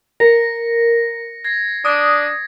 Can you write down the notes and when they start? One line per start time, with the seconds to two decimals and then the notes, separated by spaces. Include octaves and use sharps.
0.20 A#4 A#6 C#7
1.44 G#6 A#6 C7
1.85 D4 D#6